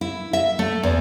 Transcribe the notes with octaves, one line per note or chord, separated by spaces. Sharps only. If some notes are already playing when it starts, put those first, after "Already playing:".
E4
E5
A3
E2